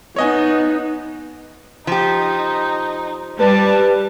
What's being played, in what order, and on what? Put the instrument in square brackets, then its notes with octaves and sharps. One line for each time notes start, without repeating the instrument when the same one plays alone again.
[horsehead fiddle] B3 D#4 [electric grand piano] C#5 D#5 G#5
[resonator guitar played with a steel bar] F3 G4 [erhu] D#4
[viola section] G3 [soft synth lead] B4 [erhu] A5